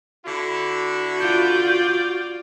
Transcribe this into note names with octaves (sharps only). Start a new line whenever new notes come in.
D3 E4 F#4
F4 D5 G6